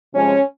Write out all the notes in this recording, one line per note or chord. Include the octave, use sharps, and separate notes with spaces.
C3 F3 G#3 C#4